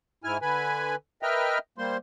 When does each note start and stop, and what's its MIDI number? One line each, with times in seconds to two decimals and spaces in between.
0.24 0.37 44
0.24 0.37 64
0.24 0.37 80
0.24 0.37 89
0.42 0.95 50
0.42 0.95 71
0.42 0.95 80
0.42 0.95 83
1.23 1.58 70
1.23 1.58 71
1.23 1.58 75
1.23 1.58 76
1.23 1.58 79
1.23 1.58 89
1.78 1.97 55
1.78 1.97 58
1.78 1.97 72
1.78 1.97 84